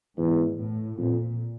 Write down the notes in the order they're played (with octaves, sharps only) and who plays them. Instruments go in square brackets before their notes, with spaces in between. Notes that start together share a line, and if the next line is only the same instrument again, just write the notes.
[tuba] E2 [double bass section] G#2
[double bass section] A2
[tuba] F2 [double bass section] A#2